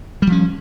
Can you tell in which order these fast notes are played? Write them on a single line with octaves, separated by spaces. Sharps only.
G3 F3 C#4